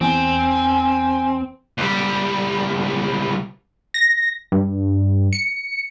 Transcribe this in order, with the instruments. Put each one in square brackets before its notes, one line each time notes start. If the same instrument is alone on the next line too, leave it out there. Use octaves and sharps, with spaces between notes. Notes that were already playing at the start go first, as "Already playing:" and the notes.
[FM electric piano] E2 [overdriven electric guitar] C4 [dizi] G#5
[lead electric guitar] C#2 G3
[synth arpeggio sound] A#6
G2
C#7